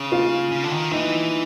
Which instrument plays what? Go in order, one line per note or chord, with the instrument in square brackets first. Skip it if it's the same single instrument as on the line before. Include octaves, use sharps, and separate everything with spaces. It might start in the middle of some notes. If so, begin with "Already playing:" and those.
Already playing: [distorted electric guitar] C#3
[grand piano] F4
[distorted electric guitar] C#3
D3
D#3
[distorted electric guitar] E3 [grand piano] D#4